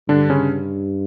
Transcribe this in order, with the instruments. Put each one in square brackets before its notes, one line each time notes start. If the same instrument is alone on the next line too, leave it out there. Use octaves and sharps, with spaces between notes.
[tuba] G2 [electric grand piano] D3 D4
[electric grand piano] C#3 C#4